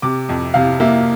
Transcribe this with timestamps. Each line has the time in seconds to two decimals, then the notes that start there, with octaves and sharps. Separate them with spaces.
0.02 C3 D6
0.29 F2
0.54 C3 F5
0.80 A#3 E5